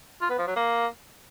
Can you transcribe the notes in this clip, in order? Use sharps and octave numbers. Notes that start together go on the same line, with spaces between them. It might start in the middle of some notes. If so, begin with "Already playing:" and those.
F4
B3
F3
F#3
A#3